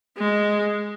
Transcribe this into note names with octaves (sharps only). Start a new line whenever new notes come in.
G#3